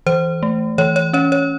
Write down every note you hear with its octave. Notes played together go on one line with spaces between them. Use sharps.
E3 C5
A3
E3 C#5
C#5
C#4 C#5
C#5